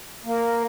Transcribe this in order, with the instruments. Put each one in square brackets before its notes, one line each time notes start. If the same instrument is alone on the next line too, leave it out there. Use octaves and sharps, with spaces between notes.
[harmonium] A#3